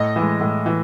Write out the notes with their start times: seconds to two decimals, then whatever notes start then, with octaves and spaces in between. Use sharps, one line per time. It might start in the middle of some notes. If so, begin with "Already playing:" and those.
Already playing: A2 D#5
0.16 E3 G#3
0.41 A2
0.66 E3